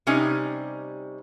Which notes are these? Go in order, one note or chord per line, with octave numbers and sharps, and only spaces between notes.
C3 G3 C#4 D#4 G#5